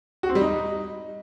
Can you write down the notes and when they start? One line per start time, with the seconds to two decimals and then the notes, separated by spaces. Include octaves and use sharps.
0.23 F#4
0.29 C4
0.35 G3
0.41 D#4